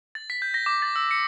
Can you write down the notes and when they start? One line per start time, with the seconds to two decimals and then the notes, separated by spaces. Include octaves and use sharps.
0.15 A6
0.30 B6
0.42 G6
0.54 A#6
0.66 D6
0.82 A6
0.96 E6
1.11 C#7